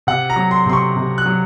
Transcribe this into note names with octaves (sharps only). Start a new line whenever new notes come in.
C3 F#5
A#5
F#3
C6
C3 C6
C#6
C3
F#6
F#3